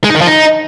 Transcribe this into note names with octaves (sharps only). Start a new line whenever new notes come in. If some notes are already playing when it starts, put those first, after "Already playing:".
G#3
D#4
D#3
F3
D#4